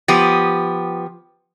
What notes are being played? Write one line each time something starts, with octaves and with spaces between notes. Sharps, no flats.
F3 B3 G4